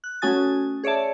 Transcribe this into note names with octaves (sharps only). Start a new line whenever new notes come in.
F#6
A3 C#4 F#4 G#5 D#6 A6
G#4 C#5 D5 E5 A5